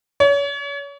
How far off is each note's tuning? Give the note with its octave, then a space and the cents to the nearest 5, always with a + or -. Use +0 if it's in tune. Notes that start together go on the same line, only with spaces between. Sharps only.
C#5 +35